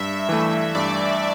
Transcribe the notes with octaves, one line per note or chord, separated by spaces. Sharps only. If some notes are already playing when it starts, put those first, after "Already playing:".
Already playing: G2 E5
E3 A3 E5
G2 D5